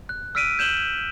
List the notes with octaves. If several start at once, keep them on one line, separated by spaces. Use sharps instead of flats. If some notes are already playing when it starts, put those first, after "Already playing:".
F#6
E6 F6 B6 D7 D#7
G6 E7 F#7 G7